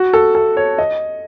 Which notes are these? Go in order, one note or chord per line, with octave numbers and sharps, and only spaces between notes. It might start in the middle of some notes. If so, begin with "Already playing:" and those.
Already playing: F#4
A4
A4
C#5
D#5